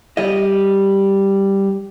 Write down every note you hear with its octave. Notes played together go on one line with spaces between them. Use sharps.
G3 D#5